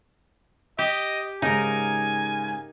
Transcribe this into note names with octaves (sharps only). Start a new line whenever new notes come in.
G4 D#5
G#2 C#3 D#4 A#4 G#5